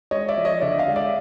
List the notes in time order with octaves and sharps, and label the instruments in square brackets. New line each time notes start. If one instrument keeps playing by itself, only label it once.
[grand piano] G#3 C#5 D#5
D5 E5
F3
C#5 D#5
D3 D5 E5
D#5 F5
G#3
D5 E5